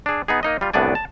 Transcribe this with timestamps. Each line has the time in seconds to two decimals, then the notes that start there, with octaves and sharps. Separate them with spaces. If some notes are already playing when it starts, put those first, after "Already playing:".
0.06 D4 G#4
0.28 B3 D#4 G#4
0.43 A#3 D#4 D#5
0.61 G3 F4
0.73 C2 A2 B3 D4 D5 G#5
0.95 A5